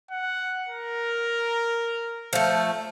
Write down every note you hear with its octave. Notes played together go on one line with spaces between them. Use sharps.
F#5
A#4
F3 A3